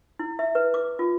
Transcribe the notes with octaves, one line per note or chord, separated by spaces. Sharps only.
E4
E5
B4
D6
F4